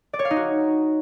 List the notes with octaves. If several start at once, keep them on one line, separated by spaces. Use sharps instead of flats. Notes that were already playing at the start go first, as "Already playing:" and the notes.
D5
C#5
F5
D#4
F#4